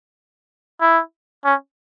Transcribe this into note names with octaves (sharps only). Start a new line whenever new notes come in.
E4
C#4